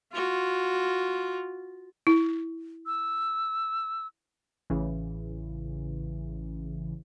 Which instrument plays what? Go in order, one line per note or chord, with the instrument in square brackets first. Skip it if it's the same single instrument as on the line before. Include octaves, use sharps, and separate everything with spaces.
[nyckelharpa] F4 F#4
[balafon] E4
[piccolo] E6
[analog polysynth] A1 C#3 E3